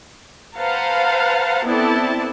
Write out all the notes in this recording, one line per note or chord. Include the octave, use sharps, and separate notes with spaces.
B4 C5 F5 F#5 A5 A#5
B3 C4 E4 A4 D5 A5